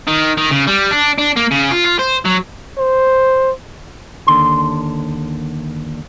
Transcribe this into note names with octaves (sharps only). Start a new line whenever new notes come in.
D#3
D#3
C#3
G3
D4
D4
A#3
C#3
F4
F4
C5
F#3
C5
D#2 D3 C6